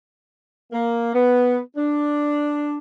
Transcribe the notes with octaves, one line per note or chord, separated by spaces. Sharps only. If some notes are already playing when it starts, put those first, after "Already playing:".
A#3
B3
D4